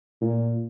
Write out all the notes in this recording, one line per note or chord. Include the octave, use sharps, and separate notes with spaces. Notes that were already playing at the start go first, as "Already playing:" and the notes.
A#2